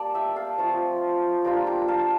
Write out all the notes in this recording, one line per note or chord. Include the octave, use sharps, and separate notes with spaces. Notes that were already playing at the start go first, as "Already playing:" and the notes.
Already playing: G3 A#3 D5 A5
E5 G5
F5 A5
F3 A3 C4 F4
G3 A#3 D4 F4 G5 A#5
G5 A#5
F5 A5